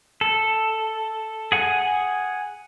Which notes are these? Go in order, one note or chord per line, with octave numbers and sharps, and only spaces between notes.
A4
G#4 F#5 G#5